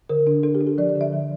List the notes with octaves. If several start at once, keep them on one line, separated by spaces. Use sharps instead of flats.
D3 A#4
D4
D4 A4
G4
D4
G4
F3 D5
D5
D3
E5
F3